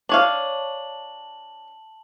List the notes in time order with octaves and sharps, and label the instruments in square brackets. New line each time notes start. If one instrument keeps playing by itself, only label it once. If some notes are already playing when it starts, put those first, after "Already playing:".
[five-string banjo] D4 C#5 F5 [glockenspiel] A5 F#7